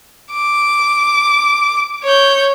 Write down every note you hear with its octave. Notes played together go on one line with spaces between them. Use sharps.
D6
C#5 G6